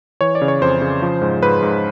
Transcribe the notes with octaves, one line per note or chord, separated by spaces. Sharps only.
E3 C#5
D5
C#3
C#5
F2 C5
C#3
F3
G#2
G#2 B4
G#2